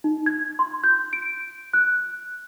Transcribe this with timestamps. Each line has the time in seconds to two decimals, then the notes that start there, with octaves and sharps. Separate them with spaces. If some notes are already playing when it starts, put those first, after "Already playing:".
0.04 D#4
0.26 G#6
0.59 C6
0.84 G6
1.13 D7
1.73 F#6